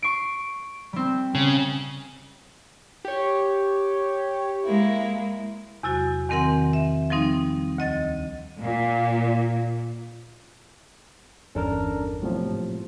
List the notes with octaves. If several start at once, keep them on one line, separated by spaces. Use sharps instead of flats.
C#6 C7 D7
G3 C4
C#3
G4 C#5
G#3 A#3 E4
E2 C3 F#3 F#4
E2 D#3 C4 A#4 F#5 C6
E5
F3 G3 C4 D#4
D2 D#5 A6
A#2
G1 E2 C#4 D4 A4 A#4
A2 C3 F3 F#3 B3
G#2